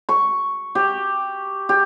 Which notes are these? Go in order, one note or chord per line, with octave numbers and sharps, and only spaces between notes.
C#6
G4
G4